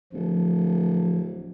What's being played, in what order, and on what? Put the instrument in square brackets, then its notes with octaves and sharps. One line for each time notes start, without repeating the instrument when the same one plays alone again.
[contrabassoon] D1 [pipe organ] F3